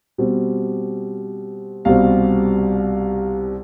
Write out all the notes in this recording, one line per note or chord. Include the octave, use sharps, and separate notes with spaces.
B2 G3 C4
C2 B2 G3 C4 F5